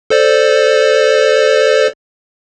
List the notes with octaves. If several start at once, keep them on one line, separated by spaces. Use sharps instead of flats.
A4 C5 D5